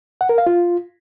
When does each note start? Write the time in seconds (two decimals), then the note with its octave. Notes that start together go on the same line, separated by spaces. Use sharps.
0.21 F#5
0.29 A#4
0.38 F5
0.47 F4